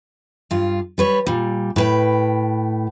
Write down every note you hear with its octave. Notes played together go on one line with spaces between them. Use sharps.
G2 F4
G3 B4 C#5
A#2 G3
A2 B4 G5